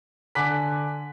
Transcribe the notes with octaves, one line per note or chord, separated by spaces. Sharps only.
D3 G#5 D6 F#6 B6